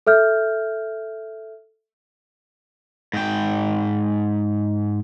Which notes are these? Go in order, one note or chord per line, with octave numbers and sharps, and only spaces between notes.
A4 E5 F6 G6
G#2 G5